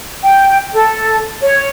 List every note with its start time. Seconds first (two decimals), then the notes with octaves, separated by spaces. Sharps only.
0.23 G5
0.73 A4
1.42 C#5